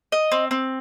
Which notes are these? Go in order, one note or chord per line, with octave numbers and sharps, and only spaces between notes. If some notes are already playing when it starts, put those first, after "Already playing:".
D#5
C4
C4